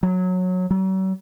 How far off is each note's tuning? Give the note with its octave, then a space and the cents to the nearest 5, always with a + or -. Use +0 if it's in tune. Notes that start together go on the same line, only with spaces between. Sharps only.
F#3 -15
F#3 +45